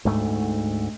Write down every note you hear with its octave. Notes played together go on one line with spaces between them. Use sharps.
D2 G#2 A3